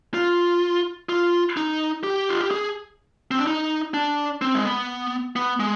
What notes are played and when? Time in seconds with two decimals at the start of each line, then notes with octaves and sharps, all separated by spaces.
0.14 F4
1.09 F4
1.57 D#4
2.03 G4
2.29 F4
2.41 G4
2.51 G#4
3.31 C4
3.39 D4
3.47 D#4
3.94 D4
4.42 C4
4.54 G#3
4.65 B3
5.36 B3
5.60 G#3